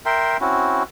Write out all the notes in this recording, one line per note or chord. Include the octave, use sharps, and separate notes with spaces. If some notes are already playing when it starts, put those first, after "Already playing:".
A#4 E5 G5 C6
C4 C#4 E4 F#4